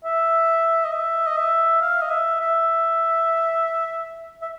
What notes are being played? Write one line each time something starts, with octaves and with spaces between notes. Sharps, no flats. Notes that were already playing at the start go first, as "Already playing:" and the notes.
E5
D#5
E5
D#5
E5
F5
D#5
E5
E5
E5